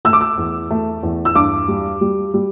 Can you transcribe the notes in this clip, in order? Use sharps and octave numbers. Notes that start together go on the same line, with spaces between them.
A3 E6
D6
E6
E2
A3
E2
E6
G2 D6
G3
G3
G3